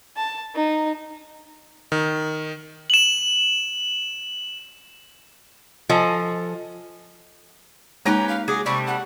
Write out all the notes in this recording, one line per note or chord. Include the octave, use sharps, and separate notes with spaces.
A5
D#4
D#3
E7 F#7
F3 A4 D#5 G#5
G#3 A#3 C#4 D#4 G4 B4 A#5
F5
F#3 G#4 D6
C3 G3 A3 C#6
F#5